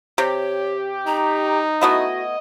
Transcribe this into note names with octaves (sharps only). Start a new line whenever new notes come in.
C3 G4 C#5
D#4 A#5
A3 B3 E4 F#4 D#5